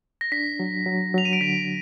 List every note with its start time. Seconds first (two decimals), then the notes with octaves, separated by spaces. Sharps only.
0.21 A#6
0.32 D4 B6
0.60 F#3
0.86 F#3
1.14 F#3 F7
1.25 D#7
1.33 D7
1.41 D3 B6